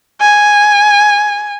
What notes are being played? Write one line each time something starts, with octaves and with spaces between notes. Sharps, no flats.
G#5